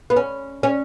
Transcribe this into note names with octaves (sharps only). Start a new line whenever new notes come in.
B3
C#4
C#4